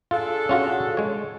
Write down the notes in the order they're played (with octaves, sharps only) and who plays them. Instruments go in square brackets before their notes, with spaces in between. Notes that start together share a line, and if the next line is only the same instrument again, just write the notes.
[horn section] D4 G#4 A4 [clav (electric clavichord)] F4
[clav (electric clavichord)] C#4 F4 F#4
G#3 C#5